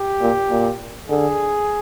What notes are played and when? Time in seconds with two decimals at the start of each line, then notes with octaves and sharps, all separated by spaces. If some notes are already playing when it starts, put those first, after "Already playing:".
Already playing: G4
0.21 A#2
0.50 A#2
1.09 D3 G#4